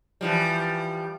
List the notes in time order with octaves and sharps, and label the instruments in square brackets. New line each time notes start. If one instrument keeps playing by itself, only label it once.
[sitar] E3 F3 G3